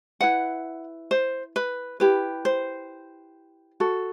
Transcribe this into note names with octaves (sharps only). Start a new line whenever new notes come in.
E4 B4 F#5
C5
B4
E4 G4 B4
C5
F#4 A4